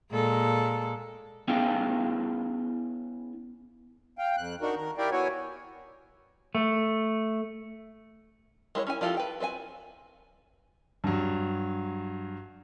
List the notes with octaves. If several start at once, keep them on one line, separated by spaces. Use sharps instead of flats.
A#2 G#3 A4
B3 C#4 E4 G#4 F5 G5
F5 G5
F2 F#6
D4 D#4 F#4 A#4
D#3 A#4
E4 G4 A#4 D5 F5 G5
B3 E4 F#4 C#5 G#5
A3
G#3 E4 C5 C#5
C#4 E4 G#5
F3 E4 F4 G4 A4
B4 G5
C4 B4 E5 G#5
G2 F#3